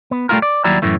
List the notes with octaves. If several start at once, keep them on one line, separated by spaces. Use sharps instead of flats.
B3
G3 A3 C4 E4 F4 A#4
D5
D#2 F#3 G3 E4 D5 A#5
F#2 A2 E3 A3